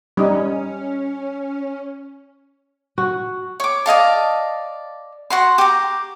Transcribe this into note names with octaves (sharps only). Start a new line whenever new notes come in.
G3 C#4 D#4
F#4
C#5 D6
D5 D#5 F5 A5
F#4 F#5 C6
G4 A#5